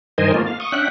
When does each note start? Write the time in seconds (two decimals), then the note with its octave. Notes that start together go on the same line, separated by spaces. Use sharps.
0.18 G2 D#3 A#4 C5 D#5 G#5
0.34 A3 A#3 F4
0.46 F5
0.60 C#6 D#6
0.72 C#4 D4 E5 F#5 G5 F#6